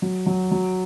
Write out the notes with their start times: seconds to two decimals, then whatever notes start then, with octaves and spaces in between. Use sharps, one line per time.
0.02 F#3
0.26 F#3
0.51 F#3